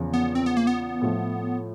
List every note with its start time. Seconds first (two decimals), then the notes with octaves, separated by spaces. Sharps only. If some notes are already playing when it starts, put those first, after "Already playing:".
Already playing: E2 C#3 F3
0.13 B3
0.35 C4
0.46 B3
0.57 A#3
0.67 B3
1.01 A2 F3 A3